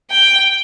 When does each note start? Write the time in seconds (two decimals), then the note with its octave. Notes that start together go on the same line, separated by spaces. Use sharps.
0.11 G5